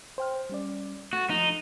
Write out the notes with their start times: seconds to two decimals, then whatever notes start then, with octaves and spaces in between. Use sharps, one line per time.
0.18 C5 G5 F6
0.50 G3 C#4 D5
1.13 A3 F#4 A6
1.30 F3 A3 D#4